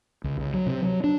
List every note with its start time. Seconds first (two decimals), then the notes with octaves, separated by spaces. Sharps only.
0.24 C#2
0.40 C#2
0.54 F#3
0.66 C3
0.82 F#3
1.04 D4